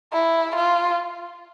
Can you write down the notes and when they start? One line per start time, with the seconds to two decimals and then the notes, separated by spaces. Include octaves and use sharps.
0.13 E4
0.56 F4